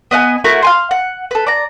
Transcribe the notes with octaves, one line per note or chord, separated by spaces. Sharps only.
B3 D#5 F#5 G#5
A3 E4 F#4 A#4
F5 G#5 C6
F#5
A4 B4
D5 A#5